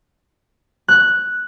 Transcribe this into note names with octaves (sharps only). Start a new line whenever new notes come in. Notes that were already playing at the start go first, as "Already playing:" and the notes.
F#6